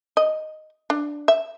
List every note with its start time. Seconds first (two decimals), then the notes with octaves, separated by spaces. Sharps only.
0.17 D#5
0.90 D4
1.28 E5